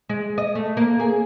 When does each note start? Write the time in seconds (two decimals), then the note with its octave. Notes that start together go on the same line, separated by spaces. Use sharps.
0.09 G#3
0.38 D#5
0.55 A3
0.77 A#3
1.00 G#4